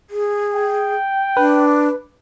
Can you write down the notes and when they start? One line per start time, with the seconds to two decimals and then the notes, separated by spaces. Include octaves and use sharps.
0.10 G#4
0.55 G5
1.37 D4 B4